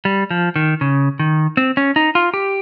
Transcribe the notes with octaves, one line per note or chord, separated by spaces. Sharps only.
G3
F3
D#3
C#3
D#3
C4
C#4
D#4
F4
G4